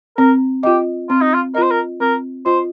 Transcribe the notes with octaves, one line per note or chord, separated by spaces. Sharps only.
C4 A#4
F4 G4 D#5
C4 F4
D#4
F4
F4 A#4 C5 D#5
A#4
C4 A#4
F4 C5 D#5